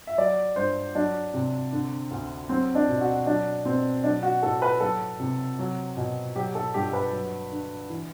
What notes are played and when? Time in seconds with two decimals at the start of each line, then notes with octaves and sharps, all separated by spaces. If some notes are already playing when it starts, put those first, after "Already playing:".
0.07 E5
0.18 F#3 D5
0.56 G2 C5
0.95 F#3 D4
1.34 C3
1.72 D3
2.11 D2
2.49 F#3 C4
2.75 D4
2.88 B2
3.01 F#4
3.26 F#3 D4
3.65 B2 C4
4.04 F#3 D4
4.23 F#4
4.43 A2 A4
4.62 B4
4.80 F#3 A4
5.20 C3
5.59 F#3
5.97 B2
6.36 F#3 G4
6.55 A4
6.74 G2 G4
6.93 B4
7.12 F#3
7.51 D3
7.90 E3